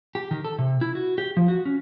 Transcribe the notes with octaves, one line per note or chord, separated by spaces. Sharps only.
G4
D#3
A4
C3
E4
F#4
G4
F3
F#4
C#4